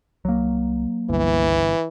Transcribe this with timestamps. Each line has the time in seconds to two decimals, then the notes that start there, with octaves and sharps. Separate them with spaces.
0.25 C2 F#3 A#3
1.10 G1 C#2 E3